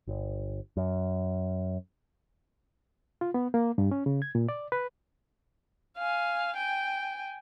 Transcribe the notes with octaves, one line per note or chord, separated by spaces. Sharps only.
G1
F#2
F4
B3
A#3
G2
C#4
C#3
G#6
A#2
D5
B4
F5 G#5
G5 G#5